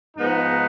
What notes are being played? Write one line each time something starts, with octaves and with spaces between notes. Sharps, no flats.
G#2 F3 G#3 B3 D#4